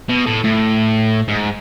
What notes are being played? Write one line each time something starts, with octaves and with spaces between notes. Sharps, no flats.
B2
A2
A2
G#2